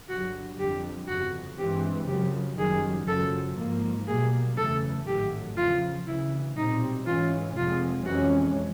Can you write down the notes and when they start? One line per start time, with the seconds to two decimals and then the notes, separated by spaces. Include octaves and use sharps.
0.09 G1 G2 D3 F#3 F#4
0.59 F2 D3 G3 G4
1.08 G1 F2 C#3 F#4
1.58 G2 E3 G#3 C4 G4
2.08 F#2 C#3 F3 G4
2.57 F#1 F#2 D#3 G3 G#4
3.07 F#1 F#2 C#3 F3 A4
3.57 G#1 G#2 F3 A#3
4.07 B1 B2 G3 A#3 G#4
4.57 F#1 E2 C#3 E3 A3 A4
5.07 A1 G#2 D#3 F#3 A3 G4
5.57 E2 C#3 F3 F4
6.06 D2 C#3 E3 E4
6.57 B1 A#2 G3 C4 D#4
7.06 G#2 E3 G#3 C#4 F4
7.56 F1 F2 C3 F3 G#3 F4
8.05 F2 C3 E3 G#3 C#4 F#4